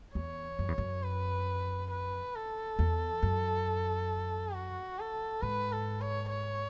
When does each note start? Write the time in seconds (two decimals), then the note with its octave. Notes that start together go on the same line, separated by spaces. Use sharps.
0.15 E2 C#5
0.59 F#2
0.68 E2
0.78 F#2
1.03 B4
1.90 B4
2.35 A4
2.79 E2
3.23 F#2
4.55 F#4
4.99 A4
5.42 G#2 B4
5.72 A4
6.01 C#5
6.30 C#5